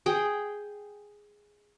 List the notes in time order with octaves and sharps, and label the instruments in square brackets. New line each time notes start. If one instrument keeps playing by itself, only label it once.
[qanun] G#4 G5